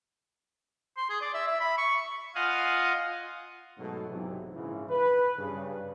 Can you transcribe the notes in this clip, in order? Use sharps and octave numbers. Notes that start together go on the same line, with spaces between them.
C6
G#4
D5
E5
E5
B5
C#6
F4 D#5 F5 F#5 G#5
G#2 B2 F#3 A3 A4
B1 G#2 C3 E3 F#3
A#1 G#2 C#3 E3 E4
B4
G2 C#3